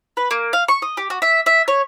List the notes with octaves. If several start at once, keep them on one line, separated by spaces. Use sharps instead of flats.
B4
A#3
F5
C#6
D#5
G4
F#4
E5
E5
C#5